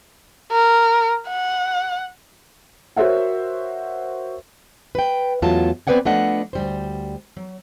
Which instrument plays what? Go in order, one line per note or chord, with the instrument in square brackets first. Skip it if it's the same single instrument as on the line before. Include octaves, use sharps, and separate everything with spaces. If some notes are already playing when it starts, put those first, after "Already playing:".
[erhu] A#4
F#5
[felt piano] F#4 A#4 C5 C#5 E5 F#5
[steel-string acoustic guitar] B4 G5
E2 F#3 A3 F4 A5
B3 C4 B4 D5 F#5 G#5
F3 A3 B3 D4 D#5 F#5
D2 G3 C5
F#3